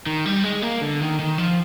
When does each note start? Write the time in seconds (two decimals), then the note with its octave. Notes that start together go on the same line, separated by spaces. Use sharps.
0.06 D#3
0.25 G3
0.43 G#3
0.62 A#3
0.81 D3
1.01 D#3
1.19 D#3
1.38 F3